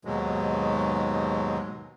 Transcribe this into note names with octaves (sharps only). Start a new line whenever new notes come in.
D#2 G#2 B2 F#3 G#3